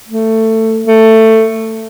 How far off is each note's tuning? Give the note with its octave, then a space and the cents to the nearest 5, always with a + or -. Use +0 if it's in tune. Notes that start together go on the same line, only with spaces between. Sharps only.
A3 +15
A3 +15